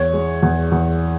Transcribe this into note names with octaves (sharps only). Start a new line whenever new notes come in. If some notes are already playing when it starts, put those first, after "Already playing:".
Already playing: E2 C#5
G#3
E2
E2